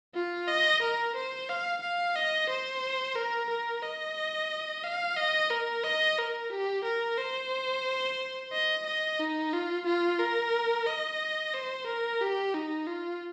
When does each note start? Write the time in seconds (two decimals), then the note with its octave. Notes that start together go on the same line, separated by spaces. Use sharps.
0.14 F4
0.48 D#5
0.82 A#4
1.16 C5
1.49 F5
1.82 F5
2.16 D#5
2.49 C5
3.16 A#4
3.49 A#4
3.83 D#5
4.84 F5
5.17 D#5
5.50 A#4
5.84 D#5
6.18 A#4
6.50 G4
6.84 A#4
7.18 C5
8.52 D#5
8.86 D#5
9.19 D#4
9.53 F4
9.86 F4
10.19 A#4
10.86 D#5
11.53 C5
11.86 A#4
12.21 G4
12.54 D#4
12.87 F4